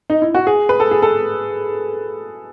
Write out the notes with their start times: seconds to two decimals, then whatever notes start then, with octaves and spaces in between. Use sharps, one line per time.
0.10 D#4
0.22 E4
0.35 F#4
0.47 G#4
0.69 B4
0.80 A4
0.91 G#4
1.02 A4